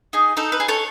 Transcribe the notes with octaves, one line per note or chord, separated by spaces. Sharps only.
D#4 G#4
D#4 A4
B4
G#4
A4 C#5